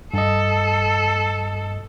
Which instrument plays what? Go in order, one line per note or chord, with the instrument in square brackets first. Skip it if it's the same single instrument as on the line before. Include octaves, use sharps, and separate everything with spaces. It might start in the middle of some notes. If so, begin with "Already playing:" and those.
[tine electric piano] G2 D#5 [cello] A4